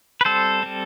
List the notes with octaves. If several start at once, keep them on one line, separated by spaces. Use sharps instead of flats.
B4
G3 C4 A4 C5
G3 C4